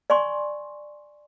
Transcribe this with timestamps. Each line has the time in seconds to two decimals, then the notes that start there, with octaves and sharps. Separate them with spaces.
0.10 D5 G#5 C6 C#6